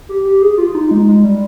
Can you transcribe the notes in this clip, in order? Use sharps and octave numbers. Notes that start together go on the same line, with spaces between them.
G4
G4
G#4
F4
F4
D#4
G#3
G#3
G3